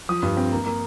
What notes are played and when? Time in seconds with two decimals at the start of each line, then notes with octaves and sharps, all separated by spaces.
0.09 F3 D#6
0.23 G2
0.37 C4
0.52 A#3
0.65 A#3